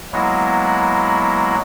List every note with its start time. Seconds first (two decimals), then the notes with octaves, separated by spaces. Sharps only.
0.13 F#3 G#3 A#3 B3 E4 F#4